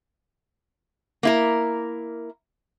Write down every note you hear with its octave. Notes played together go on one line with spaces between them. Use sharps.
A#3 E4 A#4